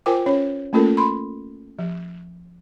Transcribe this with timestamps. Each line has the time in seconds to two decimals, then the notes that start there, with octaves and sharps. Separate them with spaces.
0.06 F4 A#4 C5 G5 G#5 D6
0.26 C#4 C#5
0.73 A3 A#3 C#4 F4 A4 A#4
0.97 B5 C6
1.79 F3